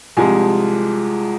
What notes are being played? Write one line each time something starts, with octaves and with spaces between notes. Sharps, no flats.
C2 C3 F3 G#3 G#5